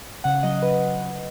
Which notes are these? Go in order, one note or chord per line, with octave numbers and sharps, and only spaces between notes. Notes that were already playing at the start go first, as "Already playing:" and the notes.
C#3 F#5
F#3 D#5
F#3 B4